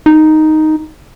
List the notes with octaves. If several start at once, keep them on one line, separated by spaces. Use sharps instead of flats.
D#4